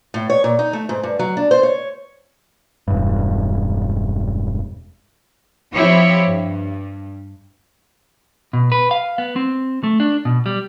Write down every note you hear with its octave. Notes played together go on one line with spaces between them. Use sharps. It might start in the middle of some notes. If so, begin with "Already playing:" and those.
A2
C#5
A#2
D#4
A3
G#2
G2
F#3
D4
C5
C#5
E1 G2
F3 C4 E4 G4 C#5
G2
B2
B4
F5
B3
C4
A3
D4
B2
G3